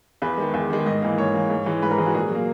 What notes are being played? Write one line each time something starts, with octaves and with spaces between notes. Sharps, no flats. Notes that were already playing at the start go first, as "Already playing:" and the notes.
E2 B4
D#3 G#3
E2
D#3 G#3
G#2 D#5
E3 A#3
G#2 C#5
E3 A#3
G#2
E3 G#3
G#2 B4
A#4
E3 G#3 F#4 G#4
A#2 G#4
F#3 A#3